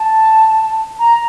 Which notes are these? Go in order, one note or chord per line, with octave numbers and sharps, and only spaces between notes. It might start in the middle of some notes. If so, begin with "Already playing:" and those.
Already playing: A5
A#5